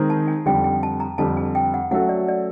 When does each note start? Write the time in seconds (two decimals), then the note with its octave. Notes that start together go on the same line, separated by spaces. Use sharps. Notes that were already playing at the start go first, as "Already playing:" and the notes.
Already playing: D#3 G#3 C4 D#4 G#4
0.10 A5
0.28 G#5
0.46 F2 D3 G3 G5
0.64 G5
0.83 A5
1.00 A#5
1.18 F2 D3 G3 A5
1.37 G#5
1.55 G5
1.74 F#5
1.91 F#3 A3 C#4 F#4 A4 F#5
2.09 D5
2.28 D5